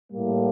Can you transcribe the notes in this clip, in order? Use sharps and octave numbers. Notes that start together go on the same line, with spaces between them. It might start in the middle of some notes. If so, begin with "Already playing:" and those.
A2 G3 A#3